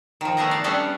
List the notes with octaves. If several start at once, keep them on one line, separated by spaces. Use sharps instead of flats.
D#3 F3
A3 B3 D#4 G#4 D#5 A#5
D5 F5
G3 B3 C#4 D4 G#4 A4